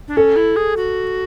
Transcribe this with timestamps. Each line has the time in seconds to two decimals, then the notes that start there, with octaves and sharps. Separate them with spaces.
0.08 D4
0.16 C#4 A4
0.36 E4
0.56 G#4
0.77 F#4